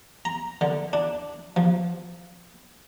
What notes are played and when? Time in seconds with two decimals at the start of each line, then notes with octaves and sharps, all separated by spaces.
0.25 A#5
0.61 D3
0.93 D4
1.56 F3